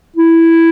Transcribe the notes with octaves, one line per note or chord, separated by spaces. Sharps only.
E4